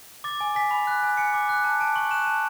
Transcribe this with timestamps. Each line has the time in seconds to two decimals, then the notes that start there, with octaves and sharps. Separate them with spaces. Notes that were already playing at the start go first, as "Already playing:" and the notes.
0.24 D6 A6
0.41 G#5
0.55 G#5 B6
0.71 B5
0.87 F#6
1.03 G#5
1.17 G#5 C#7
1.34 D6
1.49 F#6
1.64 A5
1.80 A5 D7
1.96 C#6 F#7
2.11 F#6 E7
2.26 A5